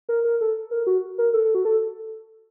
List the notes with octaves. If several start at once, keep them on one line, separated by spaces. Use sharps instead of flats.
A#4
A#4
A4
A#4
F#4
A#4
A4
A4
F#4
A4